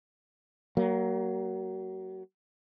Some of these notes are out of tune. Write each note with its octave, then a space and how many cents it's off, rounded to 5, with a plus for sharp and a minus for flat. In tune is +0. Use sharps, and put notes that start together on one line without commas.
F#3 +30 A#3 +0